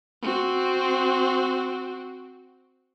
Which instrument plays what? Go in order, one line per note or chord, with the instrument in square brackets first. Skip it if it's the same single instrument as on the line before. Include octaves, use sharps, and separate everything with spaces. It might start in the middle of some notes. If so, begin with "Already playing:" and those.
[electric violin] C4 F#4